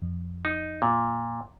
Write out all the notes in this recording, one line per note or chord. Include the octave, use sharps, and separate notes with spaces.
F2
D#4
A#2